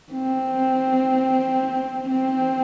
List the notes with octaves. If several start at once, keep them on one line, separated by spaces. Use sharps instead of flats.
C4
C4